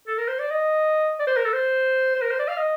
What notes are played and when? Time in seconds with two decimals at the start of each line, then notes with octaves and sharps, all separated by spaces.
0.07 A4
0.18 A#4
0.28 C5
0.39 D5
0.50 D#5
1.19 D5
1.27 C5
1.37 A#4
1.45 A4
1.53 C5
2.15 C5
2.22 A#4
2.31 C5
2.39 D5
2.48 F5
2.57 D#5